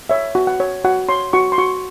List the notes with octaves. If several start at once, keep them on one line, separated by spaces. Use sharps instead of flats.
C#5 E5
F#4
F#5
C#5
F#4 F#5
C#5 C6
F#4 C#6
C6
F#4 C#6